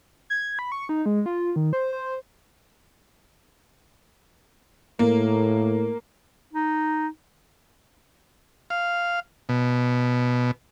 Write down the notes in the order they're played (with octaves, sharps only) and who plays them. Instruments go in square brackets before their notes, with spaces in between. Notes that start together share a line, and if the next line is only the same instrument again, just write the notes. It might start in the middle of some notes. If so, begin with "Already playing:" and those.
[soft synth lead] G#6
B5
C#6
D#4
G#3
F4
D#3
C5
C5
[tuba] A2 [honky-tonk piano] A#3
[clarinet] D#4
[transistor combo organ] F5
B2